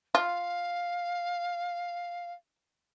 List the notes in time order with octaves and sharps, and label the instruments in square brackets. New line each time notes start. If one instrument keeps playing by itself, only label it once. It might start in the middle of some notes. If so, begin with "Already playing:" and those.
[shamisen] F4 [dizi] F5